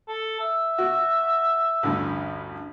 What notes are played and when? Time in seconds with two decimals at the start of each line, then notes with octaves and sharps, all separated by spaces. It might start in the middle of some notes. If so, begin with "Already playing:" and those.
0.08 A4
0.40 E5
0.78 F#4
1.83 A1 D2 G2